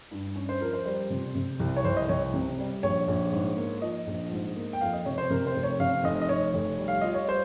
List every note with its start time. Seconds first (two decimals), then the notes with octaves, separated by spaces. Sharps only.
0.11 G2
0.36 C#4
0.49 C5
0.61 F3 A#4
0.73 C5
0.86 G3 C5
1.10 C3
1.35 C3
1.60 C2
1.76 C#5
1.84 C2 C5
1.97 D#5
2.09 C2 C#5
2.34 C3
2.59 G3
2.83 A#1 C#5
3.08 A#1
3.33 G#2
3.57 A#3
3.82 F3 D#5
4.07 A#1
4.32 G#2
4.56 A#3
4.73 G5
4.81 F2 F5
4.93 D#5
5.05 C3 C#5
5.18 C5
5.30 C3 A#4
5.47 C5
5.55 F1
5.63 C#5
5.80 C3 F5
6.04 F1 D#5
6.22 D#5
6.29 F1 C#5
6.54 F1
6.79 G3
6.88 F5
7.01 F4 D#5
7.14 C#5
7.28 G3 C5